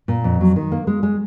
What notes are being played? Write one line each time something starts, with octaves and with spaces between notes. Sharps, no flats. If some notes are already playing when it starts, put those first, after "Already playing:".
A#2
F2
F#3
D#3
A#3
G#3
G#3